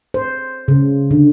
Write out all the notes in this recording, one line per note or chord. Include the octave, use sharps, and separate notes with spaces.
C5
C#3
D3